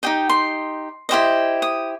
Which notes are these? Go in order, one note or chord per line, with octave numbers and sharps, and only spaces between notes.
D#4 G4 D#5 G5
C6
E4 G4 C5 D#5
D#6